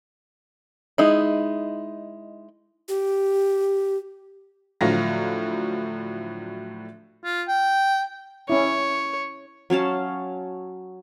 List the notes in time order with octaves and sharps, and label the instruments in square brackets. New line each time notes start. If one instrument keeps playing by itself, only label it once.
[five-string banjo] G#3 D#4 E4
[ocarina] G4
[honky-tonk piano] A2 D3 F3 F#3 F5 A#6
[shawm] F4
G5
[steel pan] C#4 E4 [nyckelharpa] C#5
[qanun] F#3 C#4 F5 A5